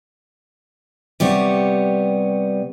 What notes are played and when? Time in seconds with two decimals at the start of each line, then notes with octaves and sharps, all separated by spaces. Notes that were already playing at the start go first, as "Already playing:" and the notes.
1.20 C3 G3 B3 C#5